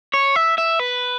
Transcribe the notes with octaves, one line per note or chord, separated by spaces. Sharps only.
C#5
E5
E5
B4